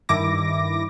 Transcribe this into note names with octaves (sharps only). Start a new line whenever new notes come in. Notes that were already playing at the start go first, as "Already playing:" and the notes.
G2 D#3 E4 D6 A#6